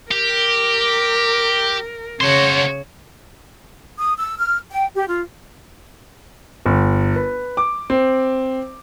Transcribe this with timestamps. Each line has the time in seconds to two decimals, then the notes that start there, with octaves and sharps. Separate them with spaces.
0.11 G4 A#4
2.21 C#3 F#4 C5 C#5
3.98 D#6
4.19 E6
4.38 F6
4.70 G5
4.94 G4
5.07 F4
6.66 G1
7.16 B4
7.57 D6
7.90 C4